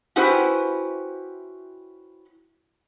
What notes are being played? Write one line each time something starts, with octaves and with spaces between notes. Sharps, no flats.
C#4 E4 F#4 G4 B4 C5